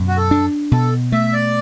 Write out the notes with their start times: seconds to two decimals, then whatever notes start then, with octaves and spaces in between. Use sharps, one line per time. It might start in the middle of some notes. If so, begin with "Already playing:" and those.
Already playing: F#2 B2
0.08 F#4
0.17 A4
0.31 D4
0.72 B2 A4
1.12 A3 E5
1.33 D5